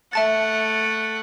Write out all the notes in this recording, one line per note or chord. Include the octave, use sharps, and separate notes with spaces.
A3 E5 F#5 A5 A6